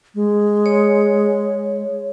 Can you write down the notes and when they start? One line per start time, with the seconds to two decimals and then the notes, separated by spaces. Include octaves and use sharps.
0.15 G#3
0.66 C#5